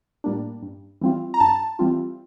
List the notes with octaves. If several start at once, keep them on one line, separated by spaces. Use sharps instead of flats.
A2 G3 A#3 D4
G2
E3 G3 C4 F4
A#5
G2 A5
E3 G3 C4 F4